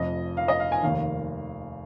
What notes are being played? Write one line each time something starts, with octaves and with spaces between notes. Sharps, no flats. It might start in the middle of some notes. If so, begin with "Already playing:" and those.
Already playing: F1 F2 F3 D#5
F5
D#5
F5
G#5
F1 D#2 D#3 F5